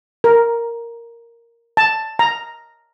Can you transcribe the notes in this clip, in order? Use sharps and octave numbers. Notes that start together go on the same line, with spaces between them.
A#4
A5
A#5